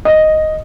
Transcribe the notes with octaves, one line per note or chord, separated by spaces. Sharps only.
D#5